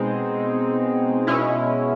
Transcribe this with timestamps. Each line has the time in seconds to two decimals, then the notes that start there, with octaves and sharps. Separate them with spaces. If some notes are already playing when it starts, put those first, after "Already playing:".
Already playing: B2 G#3 C4 D#4
1.27 B2 G#3 C#4 E4